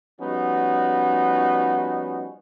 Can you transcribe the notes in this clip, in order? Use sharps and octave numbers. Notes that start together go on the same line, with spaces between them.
F3 G3 B3 C#4 D#4 F#4